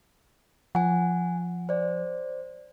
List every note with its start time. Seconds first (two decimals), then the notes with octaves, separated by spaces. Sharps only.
0.75 F3 F#5 G#5
1.69 C5 D5